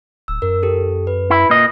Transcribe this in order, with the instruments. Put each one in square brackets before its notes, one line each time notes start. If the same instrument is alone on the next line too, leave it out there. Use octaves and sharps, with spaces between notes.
[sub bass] D1 [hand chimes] E6
[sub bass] F#2 [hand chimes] A#4
[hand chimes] G4 A4
B4
[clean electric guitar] E4
A#2 D#5